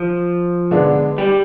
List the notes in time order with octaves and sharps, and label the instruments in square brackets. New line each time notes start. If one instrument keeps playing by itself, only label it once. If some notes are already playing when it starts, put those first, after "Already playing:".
Already playing: [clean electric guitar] F3
[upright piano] D3 G#3 B3 D4
[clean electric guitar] G3